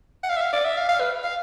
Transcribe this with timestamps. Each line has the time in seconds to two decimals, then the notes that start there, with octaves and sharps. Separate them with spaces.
0.24 F#5
0.29 F5
0.37 E5
0.41 F5
0.53 D5
0.65 E5
0.77 F5
0.89 F5
1.00 B4
1.23 F5